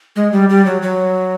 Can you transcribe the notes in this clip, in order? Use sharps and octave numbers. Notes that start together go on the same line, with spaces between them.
G#3
G3
G3
F#3
F#3